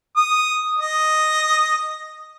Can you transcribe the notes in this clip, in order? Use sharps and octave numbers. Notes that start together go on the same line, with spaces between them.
D#6
D#5